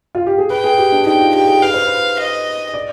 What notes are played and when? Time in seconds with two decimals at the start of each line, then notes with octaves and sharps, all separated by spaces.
0.15 F4
0.27 G4
0.38 G#4
0.50 B4 G5
0.64 G#4
0.78 G4
0.92 D4
1.06 D#4 G5
1.20 F4
1.34 G4 G5
1.48 G#4
1.62 B4 F5
1.74 C5
1.86 B4
2.18 D#5
2.74 D5